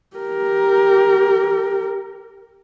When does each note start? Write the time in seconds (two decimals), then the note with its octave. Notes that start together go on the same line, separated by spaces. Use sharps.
0.16 G4 A#4